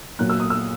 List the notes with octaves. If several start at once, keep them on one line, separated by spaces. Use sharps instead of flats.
A#2 F#3 F#6
E6
D#6
E6